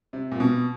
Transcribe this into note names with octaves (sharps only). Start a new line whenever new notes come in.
C3
A#2
B2